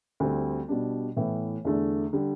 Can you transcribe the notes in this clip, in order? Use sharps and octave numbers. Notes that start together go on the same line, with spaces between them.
D2 D3 G3 C4
B2 G3 D4
A2 E3 B3
E2 D3 A3 D4
D3 G3